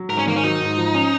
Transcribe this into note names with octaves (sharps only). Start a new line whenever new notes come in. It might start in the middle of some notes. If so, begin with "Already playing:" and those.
Already playing: F#3
G#2 A#4
C#4
D#3 A#3
C#4
F#3 D#4
G#2
F3
C#4